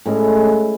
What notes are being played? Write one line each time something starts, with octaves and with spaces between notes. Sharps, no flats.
A2 G#3 C#4